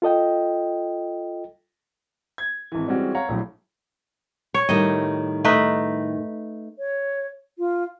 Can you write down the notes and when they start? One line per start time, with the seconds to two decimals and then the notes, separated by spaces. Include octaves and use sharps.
0.02 F4 A4 D#5 G5
2.38 G#6
2.72 G#1 E3
2.86 E3 G3 G#3 C4 C#4 F#4
3.15 C#5 F5 F#5 A#5
3.29 A#1 A2 F#3
4.54 C#5
4.69 A2 D#3 G3 D#5
5.44 A3 D#4 B4
6.79 C#5
7.58 F4